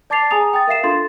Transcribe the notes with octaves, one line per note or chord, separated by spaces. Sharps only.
D5 A5 D6 A6 C7 F7
G#4 G#5 A#5 D#6 F7
G5 D#6 A6
A#4 E5 F5 C7 E7
D4 F4 A4 C6 A6